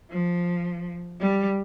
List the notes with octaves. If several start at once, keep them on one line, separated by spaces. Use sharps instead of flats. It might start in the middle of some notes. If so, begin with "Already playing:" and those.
F3
G3